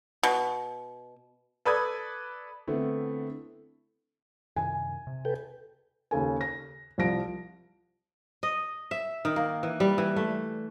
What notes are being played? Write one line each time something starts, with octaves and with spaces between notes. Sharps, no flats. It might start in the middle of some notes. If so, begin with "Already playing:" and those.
B2
A4 B4 D5 B5 D#6 G#6
D3 A3 B3 C4 E4
F#2 C3 D#3 G#5
C3
A4 B4 G5
D#2 C#3 A4 G#5
A#6
C2 F3 A#6 D7
D#5
E5
D#3
A#3
E3
G3
E3
A3